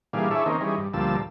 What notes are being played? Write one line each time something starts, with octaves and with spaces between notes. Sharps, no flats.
A#2 E3 G3 D4 G#4 F5
D4 E4 G#4 A4 C#5 E5
D#3 A#3 C4 C#4 D#4
E3 G3 C#4 D#4 G#4
G2
D2 A#2 F3 G3 A5 E6